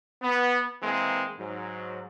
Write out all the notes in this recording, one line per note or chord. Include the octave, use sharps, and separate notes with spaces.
B3
E3 G#3 A#3 C4
G#2 F#3